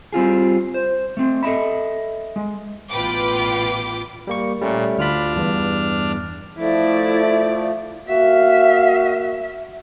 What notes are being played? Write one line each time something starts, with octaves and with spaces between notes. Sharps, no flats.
G3 C4 F4 G#4
C5
A3 C4
A4 C5 D#5 E5 B5
G#3
A1 B2 F4 B4 G5 D6
G3 A#3 C#6
A#2 G3 A3 C#4
D2 D4 F4 B5 F6
E2 G2
F3 A3 E4 D5
A#3 F#4 E5 F5